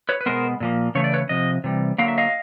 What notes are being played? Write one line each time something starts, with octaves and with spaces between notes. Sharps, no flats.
B4 C#5
B4
B2 G#3 B3 A#4 C5
A#2 F3 A#3
C#3 E3 A3 C#5
D5
B4 C#5
C3 F3 D#5
C3 E3 G3
D3 F#3 A#3 F5
E5
D#5 F5